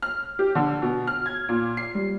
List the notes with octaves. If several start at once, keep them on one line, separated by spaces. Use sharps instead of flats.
F6
G4
D3
B2
F6
G#6
A#2
C7
G3